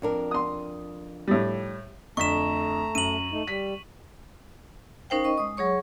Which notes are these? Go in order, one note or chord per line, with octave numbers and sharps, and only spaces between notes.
F2 D4 A#4
C6 D#6
A2 G3
F2 D3 A3 A#5 C#6 B6 E7
F#2 D#7 F#7
A3 D#4
G3 B6
C#4 D#4 A#4 C5 F5 G5
D#5 C#6
G#3 D#6
F#3 G#4 C#5 C#6